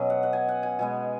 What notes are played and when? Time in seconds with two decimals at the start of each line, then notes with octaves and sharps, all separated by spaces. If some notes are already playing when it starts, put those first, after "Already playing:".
Already playing: B2 F#3 C#4 D#5
0.10 F#5
0.23 F#5
0.33 G#5
0.48 F#5
0.63 G#5
0.79 B2 G#3 B3 G#5